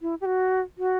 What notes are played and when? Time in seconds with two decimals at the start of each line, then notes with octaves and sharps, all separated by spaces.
0.02 E4
0.21 G4
0.25 F#4
0.78 F#4